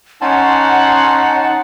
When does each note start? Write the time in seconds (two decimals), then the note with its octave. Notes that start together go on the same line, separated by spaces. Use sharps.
0.21 C#4 D#4 F#5 A5 C6